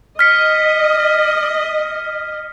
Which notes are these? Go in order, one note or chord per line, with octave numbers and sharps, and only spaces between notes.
D#5 F6 B6 C#7